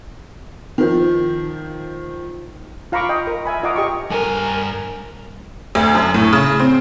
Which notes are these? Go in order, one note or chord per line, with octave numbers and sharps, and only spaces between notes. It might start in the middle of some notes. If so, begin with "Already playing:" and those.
D#3 F3
F4 F5 A#5 B5 C#6 D6
D#5 G5
A#4
E5 G#5 B5
F4 D#5 F5 F#5 A#5 D6
G4 D#5 C#6
G2 A#4 G#5
D2
F#2
A2
C#3
C4